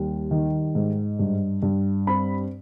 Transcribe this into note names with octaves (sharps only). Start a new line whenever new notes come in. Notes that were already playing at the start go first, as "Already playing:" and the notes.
Already playing: D#2 G3
D#3
G#2
G2
G2
C4 B5